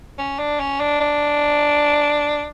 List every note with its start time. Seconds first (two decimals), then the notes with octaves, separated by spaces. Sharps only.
0.18 C#4
0.38 D4
0.59 C#4
0.80 D4
1.00 D4